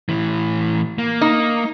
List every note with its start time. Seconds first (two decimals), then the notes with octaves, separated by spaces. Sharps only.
0.09 A2 E3
0.98 A#3
1.21 D#4